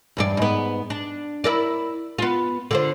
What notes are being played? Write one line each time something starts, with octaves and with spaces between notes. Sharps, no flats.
E2 G2 D5
G#2 B3
D4
E4 A#4 D5
B3 F4
D3 F4 C5